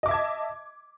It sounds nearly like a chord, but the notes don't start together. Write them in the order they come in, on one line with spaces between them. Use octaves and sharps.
D#5 D6 E5 G#6 A5